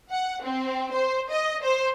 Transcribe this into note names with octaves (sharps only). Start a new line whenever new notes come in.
F#5
C4
C5
D#5
C5